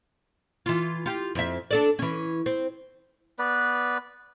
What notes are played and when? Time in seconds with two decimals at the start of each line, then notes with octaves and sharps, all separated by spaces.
0.66 E3 F4
1.06 F4 G4
1.35 F2 E5
1.71 D4 A4 D5
1.99 E3 C#4
2.46 C4
3.39 B3 B4 D5